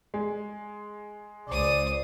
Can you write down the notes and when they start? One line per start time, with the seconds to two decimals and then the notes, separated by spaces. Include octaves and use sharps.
0.14 G#3
1.49 C#2 C5 D5 D#6